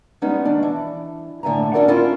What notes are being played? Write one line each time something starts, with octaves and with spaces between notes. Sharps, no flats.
G3 G#3 B3 C#4 D#4
D#3 D4
E3
A2 D3 E5 G#5 A#5
C#4 D4 F#4 A4 A#4 D5
C#4 E4 F4 A4 A#4